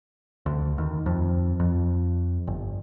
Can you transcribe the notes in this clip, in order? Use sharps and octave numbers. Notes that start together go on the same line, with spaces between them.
D2
D#2
F2
F2
G1